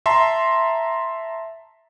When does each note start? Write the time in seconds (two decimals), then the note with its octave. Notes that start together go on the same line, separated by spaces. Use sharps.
0.06 E5 A5 A#5 C6